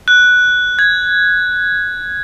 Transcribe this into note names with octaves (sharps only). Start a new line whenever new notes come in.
F#6
G#6